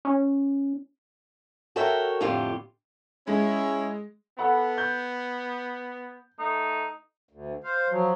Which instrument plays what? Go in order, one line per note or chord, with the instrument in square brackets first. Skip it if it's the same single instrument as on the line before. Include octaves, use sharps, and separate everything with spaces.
[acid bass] C#4
[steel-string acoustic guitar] F#4 A4 A#4 C#5 E5 G5
F2 A2 D3 F4 G4
[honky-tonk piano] G#3 [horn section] C#4 E4
[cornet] B3 [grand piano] A4 F#5 B5
[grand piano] G6
[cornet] A3 [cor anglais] D#4
[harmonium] D2
C5 F5
F3 F#3